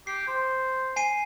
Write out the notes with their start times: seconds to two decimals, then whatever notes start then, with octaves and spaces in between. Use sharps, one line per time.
0.07 G4 C7
0.27 C5
0.96 G#5 C7 D#7